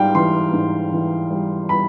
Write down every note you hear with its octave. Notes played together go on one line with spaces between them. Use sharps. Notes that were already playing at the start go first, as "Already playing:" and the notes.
Already playing: G#2 G3 F5 G5
E3 C6
G#2
E3
G3
G3 B5